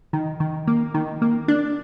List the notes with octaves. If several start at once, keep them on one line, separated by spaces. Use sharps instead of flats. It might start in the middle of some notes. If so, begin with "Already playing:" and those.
D#3
D#3
A#3
D#3
A#3
D4